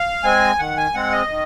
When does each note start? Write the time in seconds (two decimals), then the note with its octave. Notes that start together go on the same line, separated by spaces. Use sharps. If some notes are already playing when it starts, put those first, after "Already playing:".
Already playing: F5
0.24 G#3 C4 G#5
0.59 D#3 F#5
0.77 G#5
0.94 G#3 C4 F#5
1.12 D#5
1.29 D#3